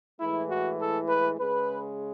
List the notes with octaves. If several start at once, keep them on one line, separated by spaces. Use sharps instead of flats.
A2 E3 G#3 E4
F#4
A4
B4
C#3 G#3 B4